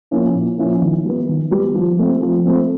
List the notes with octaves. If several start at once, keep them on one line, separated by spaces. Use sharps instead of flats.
F3 A#3 C#4 E4
A#2
F3 A#3 C#4 E4
D#3
G3 B3
D#3
G3 B3
F3
A3 C4
F3
A3 C4